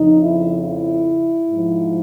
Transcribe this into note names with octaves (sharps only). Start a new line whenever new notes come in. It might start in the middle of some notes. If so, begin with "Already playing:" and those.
Already playing: F2 C#3 F3 D#4
E4
E4
G#2 F3